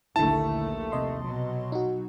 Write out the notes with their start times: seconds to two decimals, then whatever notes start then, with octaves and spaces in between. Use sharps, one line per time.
0.16 A#1 D#2 D3 A3 E4 A5
0.92 C3 D#5 C6
1.24 B2 F#3
1.72 D#4 F#4